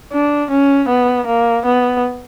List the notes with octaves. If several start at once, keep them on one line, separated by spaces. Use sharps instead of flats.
D4
C#4
B3
A#3
B3